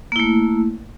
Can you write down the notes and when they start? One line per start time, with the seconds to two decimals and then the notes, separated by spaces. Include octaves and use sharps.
0.12 A#3
0.16 E4
0.20 A3